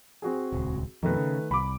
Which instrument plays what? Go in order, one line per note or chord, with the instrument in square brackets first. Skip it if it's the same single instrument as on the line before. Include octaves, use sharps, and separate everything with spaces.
[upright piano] C4 F#4 G#4
[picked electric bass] D#1 C#2
[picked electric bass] F2 B2 [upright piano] D#3 A3 B4
[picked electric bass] C#3
[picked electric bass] C2 [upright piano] B5 D6